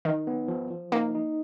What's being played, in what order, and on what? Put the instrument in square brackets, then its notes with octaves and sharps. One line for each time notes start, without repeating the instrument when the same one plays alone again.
[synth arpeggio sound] D#3 [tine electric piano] D#4
[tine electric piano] B3
F3
F3
[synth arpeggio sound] A#3 [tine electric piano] D#4
[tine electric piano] D#4